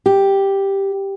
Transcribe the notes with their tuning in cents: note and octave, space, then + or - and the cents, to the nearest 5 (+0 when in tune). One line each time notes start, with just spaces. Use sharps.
G4 +0